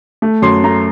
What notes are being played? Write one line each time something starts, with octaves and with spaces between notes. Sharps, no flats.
A3
F#2 C6
A3 A#5